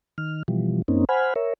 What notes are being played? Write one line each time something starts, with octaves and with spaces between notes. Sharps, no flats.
D#3 F6
B2 E3 F3 G3
F#2 A#3 C4 C#4 D#4
C5 F#5 G#5 B5 F6
A#4 C#5 E5